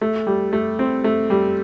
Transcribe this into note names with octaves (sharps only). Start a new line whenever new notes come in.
A3
G3
A3
C4
A3
G3